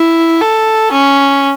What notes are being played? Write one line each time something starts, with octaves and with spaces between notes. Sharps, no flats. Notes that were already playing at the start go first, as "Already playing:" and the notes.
Already playing: E4
A4
C#4